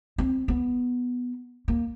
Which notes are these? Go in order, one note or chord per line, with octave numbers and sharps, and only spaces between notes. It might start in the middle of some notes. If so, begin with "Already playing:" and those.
C4
B3
A#3